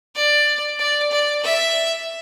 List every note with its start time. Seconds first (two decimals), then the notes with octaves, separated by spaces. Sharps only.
0.15 D5
0.79 D5
1.11 D5
1.43 E5